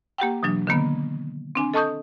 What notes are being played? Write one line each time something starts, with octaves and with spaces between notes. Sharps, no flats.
A#3 G4 F#5 G5
B2 E3 F#3 D4
D3 D#3 A#3 B3
C4 D4 G#5
A4 D#5 A5 C#6 D#6 G6